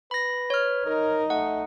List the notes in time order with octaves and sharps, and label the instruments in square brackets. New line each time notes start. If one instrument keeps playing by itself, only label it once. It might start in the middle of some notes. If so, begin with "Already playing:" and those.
[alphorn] B4 [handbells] B5 A#6
[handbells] C#5 F6
[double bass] D#4 [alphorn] A#4
[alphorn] A3 [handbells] F#5